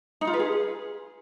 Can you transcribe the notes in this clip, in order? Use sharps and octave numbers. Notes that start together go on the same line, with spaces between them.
D#4
F4
B4
G#4